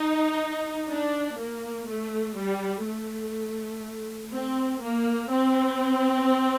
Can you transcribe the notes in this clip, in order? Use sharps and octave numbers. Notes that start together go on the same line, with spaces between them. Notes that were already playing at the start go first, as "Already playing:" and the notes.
Already playing: D#4
D4
A#3
A3
G3
A3
C4
A#3
C4